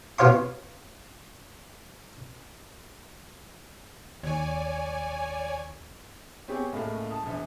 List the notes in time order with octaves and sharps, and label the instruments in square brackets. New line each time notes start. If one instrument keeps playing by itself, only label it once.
[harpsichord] B2 F4 C#5 F5 C6
[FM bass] D#2 [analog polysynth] C#5 D5 G#5
[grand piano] B3 C4 G4 G#4 C#5
C#2 A2 C#3 A#3
A5 D#6
E1 A#1